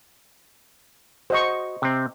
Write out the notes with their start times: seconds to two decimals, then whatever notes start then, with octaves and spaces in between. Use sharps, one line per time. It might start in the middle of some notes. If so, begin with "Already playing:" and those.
1.30 F#4 C5 D#5 C#6
1.82 C3 C4